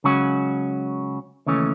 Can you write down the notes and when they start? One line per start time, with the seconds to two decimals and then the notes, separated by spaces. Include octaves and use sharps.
0.04 C#2 C#3 F#3 C#4 F#4
1.46 D#2 C#3 E3 A3 C#4